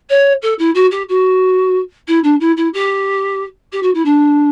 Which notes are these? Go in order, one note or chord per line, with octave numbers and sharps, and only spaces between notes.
C#5
A4
E4
F#4
G4
F#4
E4
D4
E4
E4
G4
G4
F#4
E4
D4